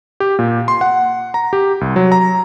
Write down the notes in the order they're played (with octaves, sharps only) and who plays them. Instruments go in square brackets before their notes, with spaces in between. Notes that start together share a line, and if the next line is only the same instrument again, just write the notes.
[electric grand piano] G4
A#2
C6
F#5
A#5
G4
C2
F#3
A#5